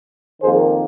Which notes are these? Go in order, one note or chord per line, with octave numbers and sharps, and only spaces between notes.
F2 D#3 A#3 G#4 C5